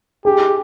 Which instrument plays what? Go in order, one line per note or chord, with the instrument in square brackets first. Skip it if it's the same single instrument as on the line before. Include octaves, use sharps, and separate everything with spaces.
[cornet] G4 [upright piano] G#4